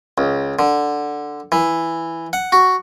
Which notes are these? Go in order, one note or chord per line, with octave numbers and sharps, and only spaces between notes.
C#2
D3
E3
F#5
F#4